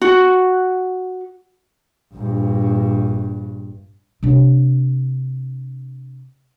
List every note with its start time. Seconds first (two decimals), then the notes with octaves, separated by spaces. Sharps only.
0.02 F#4
2.14 A#1 G2
4.23 C3 D4